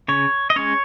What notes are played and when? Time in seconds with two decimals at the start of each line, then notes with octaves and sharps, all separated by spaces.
0.08 C#3 C#5
0.50 D#5
0.56 G#3 C#4 C#5